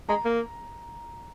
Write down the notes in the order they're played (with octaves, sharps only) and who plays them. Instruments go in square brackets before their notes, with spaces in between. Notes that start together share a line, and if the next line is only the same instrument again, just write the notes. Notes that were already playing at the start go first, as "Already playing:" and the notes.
[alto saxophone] G#3 [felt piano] A#5
[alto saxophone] A#3